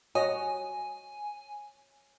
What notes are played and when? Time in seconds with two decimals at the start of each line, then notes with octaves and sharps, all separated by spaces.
0.15 F#4 C#5 D#5 G#5